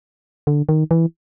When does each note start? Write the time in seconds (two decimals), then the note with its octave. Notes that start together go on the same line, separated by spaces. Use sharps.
0.47 D3
0.69 D#3
0.91 E3